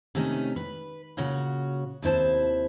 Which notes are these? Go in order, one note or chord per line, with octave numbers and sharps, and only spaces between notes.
C3 D#3 A3 C#4 D#4
B4
A#2 C#3 C#4 F#4
D#2 C3 E4 C5 A5